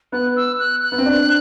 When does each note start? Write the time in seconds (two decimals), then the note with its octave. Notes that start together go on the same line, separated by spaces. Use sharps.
0.12 B3 F#6
0.36 E6
0.59 F#6
0.83 F#6
0.92 B3
0.98 C4
1.06 D4